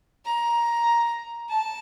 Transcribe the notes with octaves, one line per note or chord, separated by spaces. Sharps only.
A#5
A5